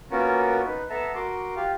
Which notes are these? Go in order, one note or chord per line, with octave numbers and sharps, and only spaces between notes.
A#3 B3 C#4 F4 F#4 A#4
D#4 B4
B3 A4 E5 A5 A#5
F#4 A#4 C6 D6
F4 G4 F5